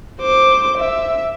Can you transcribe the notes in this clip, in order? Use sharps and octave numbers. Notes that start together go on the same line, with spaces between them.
C5 D6
E5